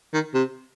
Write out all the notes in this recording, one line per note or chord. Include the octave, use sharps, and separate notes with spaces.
D#3
C3